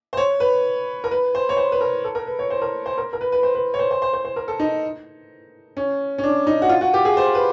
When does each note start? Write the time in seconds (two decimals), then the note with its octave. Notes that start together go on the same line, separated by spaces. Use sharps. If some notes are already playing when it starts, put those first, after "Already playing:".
0.13 C5
0.17 C#5
0.40 B4
1.04 A#4
1.11 B4
1.35 C5
1.49 C#5
1.57 C5
1.72 B4
1.81 A#4
2.04 A4
2.15 A#4
2.27 B4
2.39 C#5
2.50 C5
2.62 A#4
2.86 C5
2.98 A#4
3.13 A#4
3.21 B4
3.32 B4
3.43 C5
3.55 B4
3.74 C#5
3.79 C5
3.91 C5
4.02 C5
4.13 C5
4.25 C5
4.36 A#4
4.48 A4
4.60 D#4
5.77 C#4
6.18 C#4
6.23 D4
6.47 D#4
6.62 F#4
6.69 F4
6.81 F#4
6.94 G4
7.05 G#4
7.17 C5
7.35 B4